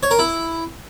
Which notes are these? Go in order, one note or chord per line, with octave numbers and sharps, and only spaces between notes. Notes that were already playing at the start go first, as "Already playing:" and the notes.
C#5
A#4
E4